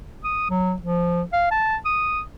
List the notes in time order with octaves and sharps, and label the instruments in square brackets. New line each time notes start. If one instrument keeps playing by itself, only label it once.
[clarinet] D#6
F#3
F3
F5
A5
D#6